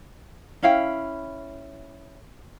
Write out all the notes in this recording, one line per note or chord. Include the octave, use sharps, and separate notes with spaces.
C#4 E4 F5 G5